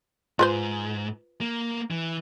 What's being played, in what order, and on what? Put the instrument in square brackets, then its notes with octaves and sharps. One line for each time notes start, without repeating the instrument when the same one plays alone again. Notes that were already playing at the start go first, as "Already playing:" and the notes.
[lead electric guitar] G#2 [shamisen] F4 B4 C5
[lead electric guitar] A#3
E3